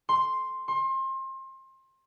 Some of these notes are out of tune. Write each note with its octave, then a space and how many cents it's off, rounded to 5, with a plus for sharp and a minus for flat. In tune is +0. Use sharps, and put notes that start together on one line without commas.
C6 +5
C6 +30